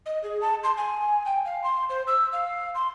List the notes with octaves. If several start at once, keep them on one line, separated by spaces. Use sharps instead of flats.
D#5
G#4
A5
C6
G#5
G5
F5
C6
C5
E6
F5
C6